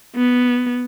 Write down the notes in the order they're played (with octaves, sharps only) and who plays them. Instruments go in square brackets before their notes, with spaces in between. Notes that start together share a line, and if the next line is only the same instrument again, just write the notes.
[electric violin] B3